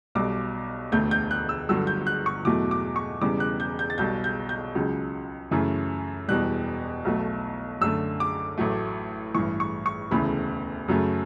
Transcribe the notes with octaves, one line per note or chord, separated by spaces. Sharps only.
B1 B2 G3 D6
E1 D2 D3 A3 G6
G6
F#6
E6
G1 G2 D3 F#3 E6
G6
F#6
C#6
E2 B2 F#3 A3 D6
D6
C#6
E1 E2 C#3 G3 D6
F#6
G6
G6
A6
B1 B2 G3 G6
G6
G6
C#2 C#3 F#3
F#2 C#3 E3 A3
E1 E2 B2 G3 F#6
B1 B2 F#3 A3
F#2 D3 A3 E6
D6
A1 A2 F#3 A3
A1 G2 E3 C#6
C#6
C#6
E1 D2 C#3 E3 A3 B5
F#2 C#3 F#3 A3